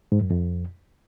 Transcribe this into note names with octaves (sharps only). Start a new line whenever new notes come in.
G#2
F#2
F2